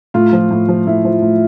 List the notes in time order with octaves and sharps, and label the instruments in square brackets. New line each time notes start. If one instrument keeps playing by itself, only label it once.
[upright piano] A2 F4
F3
A2
F3
A2 E4
F3
A2